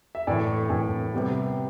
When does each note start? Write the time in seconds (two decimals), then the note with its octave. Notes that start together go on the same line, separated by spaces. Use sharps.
0.15 E5
0.27 A2 E3 A3 D5
0.70 A2 E3 A3
1.14 C3 G3 B3